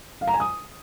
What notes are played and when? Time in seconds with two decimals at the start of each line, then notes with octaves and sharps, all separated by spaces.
0.21 F5
0.27 A#5
0.34 G#5
0.40 D#6